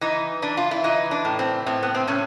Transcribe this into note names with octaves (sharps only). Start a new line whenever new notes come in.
E3 D#4
E3 D4
F4
E4
E3 D#4
D4
A2
C4
A2 C4
B3
C4
A2 C#4